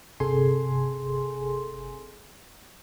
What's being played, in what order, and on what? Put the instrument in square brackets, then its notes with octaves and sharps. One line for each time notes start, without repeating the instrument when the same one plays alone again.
[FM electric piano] G1 C3 G#4 A4 G#5 C6